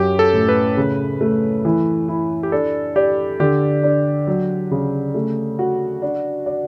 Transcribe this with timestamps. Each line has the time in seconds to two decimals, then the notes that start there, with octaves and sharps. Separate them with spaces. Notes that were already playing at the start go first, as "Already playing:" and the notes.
Already playing: F#2 F#3 G4
0.19 A4
0.33 A2
0.49 B4
0.77 C#3
1.21 A3
1.65 E3
2.08 E4
2.43 G4
2.52 D4 A4
2.96 G4 D5
3.40 D3 G4
3.83 D4
4.27 F#3
4.71 C#3
5.14 A3
5.59 F#4
6.02 D4
6.46 D5